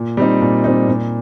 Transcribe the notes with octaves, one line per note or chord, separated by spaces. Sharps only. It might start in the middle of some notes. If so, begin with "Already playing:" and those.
Already playing: A#2
G3 C4 D#4
A#2
G3 C4 D#4
A#2